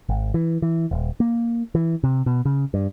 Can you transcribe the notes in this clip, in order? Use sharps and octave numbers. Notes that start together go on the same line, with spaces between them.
G#1
E3
E3
D#1
A#3
E3
C3
B2
C#3
G2